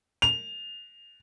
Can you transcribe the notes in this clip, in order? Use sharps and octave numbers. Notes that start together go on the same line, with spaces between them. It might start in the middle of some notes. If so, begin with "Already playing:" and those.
F7